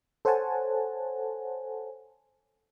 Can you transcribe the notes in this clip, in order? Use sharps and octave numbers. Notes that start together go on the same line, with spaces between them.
A4 C5 C#5 F#5 G#5 A5